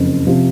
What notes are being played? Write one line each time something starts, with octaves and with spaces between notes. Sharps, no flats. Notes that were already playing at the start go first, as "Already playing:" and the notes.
Already playing: F#1 F2
C3 F3